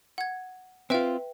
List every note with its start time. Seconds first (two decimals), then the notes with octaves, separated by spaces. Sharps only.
0.18 F#5 G#6
0.90 C4 F4 B4 E5 G5